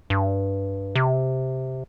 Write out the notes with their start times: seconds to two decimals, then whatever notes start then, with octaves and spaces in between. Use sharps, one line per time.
0.10 G2
0.96 C3